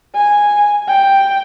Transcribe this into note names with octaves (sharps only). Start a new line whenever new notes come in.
G#5
G5